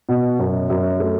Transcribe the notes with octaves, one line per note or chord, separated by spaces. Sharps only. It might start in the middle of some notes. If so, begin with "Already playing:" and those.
B2
F#2
F#2
A3